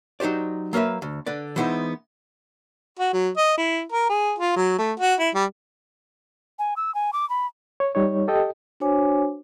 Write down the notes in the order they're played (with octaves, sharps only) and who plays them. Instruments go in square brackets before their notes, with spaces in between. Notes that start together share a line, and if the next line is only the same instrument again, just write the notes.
[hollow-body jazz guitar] F#3 D#4 G4 C5 D5
F#3 A#3 A#4 B4 E5
D2
D3 B4 D5
E3 G#3 B3 D#4 E4 C5
[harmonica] F#4
F#3
D#5
E4
A#4
G#4
F4
F#3
A3
F#4
E4
G3
[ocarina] G#5
E6
G#5
D6
B5
[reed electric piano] C#5
G3 D#4 C#5
G4 A4 D#5 G5
[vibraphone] D4 F#4 C5 C#5 G#5 D6